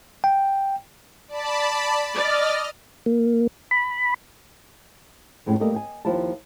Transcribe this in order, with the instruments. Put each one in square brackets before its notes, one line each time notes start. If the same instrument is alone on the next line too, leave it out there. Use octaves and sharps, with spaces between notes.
[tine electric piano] G5
[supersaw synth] D5 A5 B5
[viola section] D5 [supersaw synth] D#5 F6
[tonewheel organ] A#3
B5
[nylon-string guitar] F2 A2 G#3 C#4
G3 A3 A#3 A4 D#5
D#5 G5 G#5
D#2 F3 E4 F4 A5